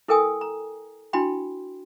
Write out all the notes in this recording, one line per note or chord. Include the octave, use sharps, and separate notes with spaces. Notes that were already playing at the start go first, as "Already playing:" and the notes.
E4 A4 A#4 G5 G#5 D#6
A#5
D4 E4 F#4 G5 B5 C6